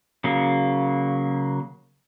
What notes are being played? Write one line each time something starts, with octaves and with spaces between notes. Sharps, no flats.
C#3 F#3 A#3